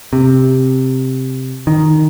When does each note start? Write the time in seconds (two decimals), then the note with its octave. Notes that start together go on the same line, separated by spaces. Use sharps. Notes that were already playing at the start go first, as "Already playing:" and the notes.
0.13 C3
1.67 D#3